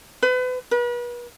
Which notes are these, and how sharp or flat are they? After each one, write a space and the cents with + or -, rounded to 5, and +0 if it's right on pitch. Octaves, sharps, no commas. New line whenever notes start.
B4 +35
B4 -40